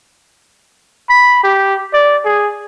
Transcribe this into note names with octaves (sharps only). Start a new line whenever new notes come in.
B5
G4
D5
G#4